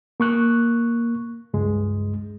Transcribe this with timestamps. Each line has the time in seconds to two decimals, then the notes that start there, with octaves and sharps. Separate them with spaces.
0.20 A#3 C#6 F#6
1.54 C#2 G2 G#3